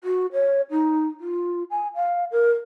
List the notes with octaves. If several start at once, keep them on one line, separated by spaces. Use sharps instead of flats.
F#4
C#5
D#4
F4
G#5
F5
A#4